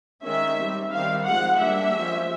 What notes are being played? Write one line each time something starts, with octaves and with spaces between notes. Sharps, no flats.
D#3 G#3 C#4 E5
G3 C4
D#3 G3 C4 F5
F3 G#3 C4 F#5
G3 A#3 D4 E5
F3 G#3 C#4